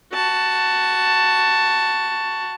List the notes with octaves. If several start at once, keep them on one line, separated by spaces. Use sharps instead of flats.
F#4 A5